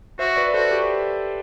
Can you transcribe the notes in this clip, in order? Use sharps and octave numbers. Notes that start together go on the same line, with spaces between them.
F#4 C5 E5
B4 D5
F#4 A4 C5
G4 B4